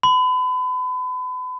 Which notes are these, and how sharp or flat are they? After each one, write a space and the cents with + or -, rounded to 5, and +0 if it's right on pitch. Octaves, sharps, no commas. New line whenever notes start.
B5 +35